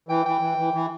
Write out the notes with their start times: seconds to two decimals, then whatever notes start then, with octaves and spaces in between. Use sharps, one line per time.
0.09 E3 G5
0.26 E3 G5
0.41 E3
0.58 E3
0.74 E3